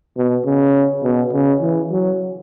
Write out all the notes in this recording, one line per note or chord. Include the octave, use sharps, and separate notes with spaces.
B2
C#3
B2
C#3
E3
F#3